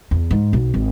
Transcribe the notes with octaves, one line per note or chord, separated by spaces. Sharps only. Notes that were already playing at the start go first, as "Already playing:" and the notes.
E2
G#2
B1
G#1